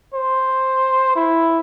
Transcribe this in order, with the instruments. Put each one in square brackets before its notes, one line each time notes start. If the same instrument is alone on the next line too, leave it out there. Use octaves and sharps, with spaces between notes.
[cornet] C5
E4